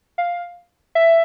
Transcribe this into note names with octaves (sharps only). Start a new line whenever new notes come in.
F5
E5